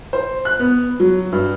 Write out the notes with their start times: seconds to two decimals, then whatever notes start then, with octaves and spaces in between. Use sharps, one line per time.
0.13 C5
0.45 F#6
0.59 B3
1.00 F#3
1.32 G2